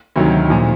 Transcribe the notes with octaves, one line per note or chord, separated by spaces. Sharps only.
D2 C3 D#3 F#3
A#2 F3